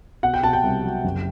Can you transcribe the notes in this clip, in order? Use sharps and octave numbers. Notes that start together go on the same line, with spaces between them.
B2 F#5
G5
B2 A5
G5
C2
F#3
F#1